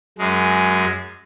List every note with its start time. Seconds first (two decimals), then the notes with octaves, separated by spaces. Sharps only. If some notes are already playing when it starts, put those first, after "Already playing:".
0.18 F#2 G#3